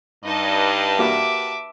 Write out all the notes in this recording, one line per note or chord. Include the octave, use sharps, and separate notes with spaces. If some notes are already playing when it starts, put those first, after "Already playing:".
G2 D#4 B4 D#5 A5
A#3 F#4 G4 E5 D6